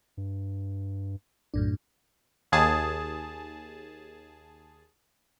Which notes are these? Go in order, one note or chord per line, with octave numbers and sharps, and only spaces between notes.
G2
B1 F#2 A2 D4
D#2 G#4 A5